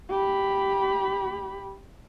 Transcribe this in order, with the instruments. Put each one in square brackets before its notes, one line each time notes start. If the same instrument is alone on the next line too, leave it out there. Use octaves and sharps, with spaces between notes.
[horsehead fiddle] G4 B5